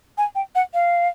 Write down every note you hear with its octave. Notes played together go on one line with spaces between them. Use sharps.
G#5
G5
F#5
F5